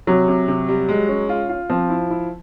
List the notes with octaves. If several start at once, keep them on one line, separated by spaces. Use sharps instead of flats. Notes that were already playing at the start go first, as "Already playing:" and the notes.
C3 F#3
C3
C3
G3
G#3
C#4
F4
F4
F3 C4
E4
E4